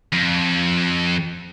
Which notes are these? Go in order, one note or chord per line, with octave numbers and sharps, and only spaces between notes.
F2